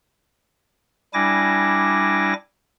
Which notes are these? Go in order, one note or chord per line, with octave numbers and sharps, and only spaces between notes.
G3 D4 E4 G#5 D6 A#6